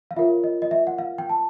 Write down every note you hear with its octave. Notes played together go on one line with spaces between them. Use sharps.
F5
F4 A#4 C#5 E5
D#5
D#5
E5
F#5
F5
G5
A5